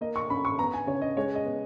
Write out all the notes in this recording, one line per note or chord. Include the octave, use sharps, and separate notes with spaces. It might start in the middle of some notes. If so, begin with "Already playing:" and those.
A#3 D#5
C#6
C#4 B5
C#6
B3 A#5
G#5
C#3 C#5
D#5
G#3 C#5
D#5
B3